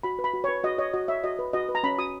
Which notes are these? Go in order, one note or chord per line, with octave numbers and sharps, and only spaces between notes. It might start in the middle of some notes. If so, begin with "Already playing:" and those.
F#4 B5
B4
B5
F#4
C#5
B4
F#4 D#5
C#5 D#5
F#4 D#5
C#5 E5
F#4 D#5
B4
F#4 D#5
B4
A#5
C#4 B5
F#4 D#6